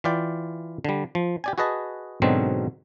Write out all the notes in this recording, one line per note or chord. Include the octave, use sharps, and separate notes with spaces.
E3 F4 D5 G5
D3 G3
F3
G4 D5 G#5
F#4 G#4 B4 D#5 A5
G#2 B2 D3 F#3 C4 D#4